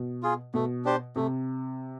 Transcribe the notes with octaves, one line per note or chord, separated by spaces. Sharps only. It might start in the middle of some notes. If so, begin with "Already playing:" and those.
Already playing: B2
F4 G#4
B2 A3
D4 G4 C5
C3 A3